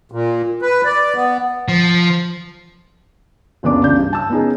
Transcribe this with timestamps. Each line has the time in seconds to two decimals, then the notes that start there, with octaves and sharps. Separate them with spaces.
0.12 A#2
0.62 B4
0.85 D5
1.16 B3
1.68 F3
3.63 F#1 C#2 E3 B3 D4 D6
3.83 C#2 C#3 D4 G6
3.98 G2
4.13 A5 E6
4.30 B3 C#4 D#4 G#4